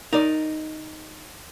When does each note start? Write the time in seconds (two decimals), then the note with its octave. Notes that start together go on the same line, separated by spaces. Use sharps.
0.13 D#4 A#4 D5